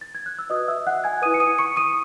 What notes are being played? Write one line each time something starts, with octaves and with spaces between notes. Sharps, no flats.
A6
G#6
F#6
E6
F#4 B4 D#5 D#6
E5 E6
F#5 F#6
G#5 G#6
E4 B4 D#6 D#7
C#7
D#6 D#7
C#6 C#7
D#6 D#7